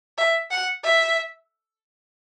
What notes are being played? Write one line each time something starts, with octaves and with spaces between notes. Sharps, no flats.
E5
F#5
E5